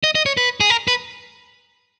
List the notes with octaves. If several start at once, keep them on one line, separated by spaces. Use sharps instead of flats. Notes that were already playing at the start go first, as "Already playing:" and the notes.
D#5
D#5
C#5
B4
G#4
A#4
B4